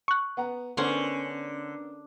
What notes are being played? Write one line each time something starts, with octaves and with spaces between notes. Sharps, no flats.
C#6 F#6
B3 F#5 A#5
D3 B3 C#4 A#4 C5 F#5 C6